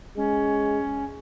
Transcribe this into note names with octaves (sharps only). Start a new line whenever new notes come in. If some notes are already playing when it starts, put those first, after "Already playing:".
G#3 C#4